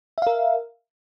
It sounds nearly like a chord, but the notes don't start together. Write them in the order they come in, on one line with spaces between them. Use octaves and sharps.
E5 F5 A#4